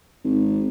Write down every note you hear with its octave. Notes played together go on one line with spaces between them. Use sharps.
G#1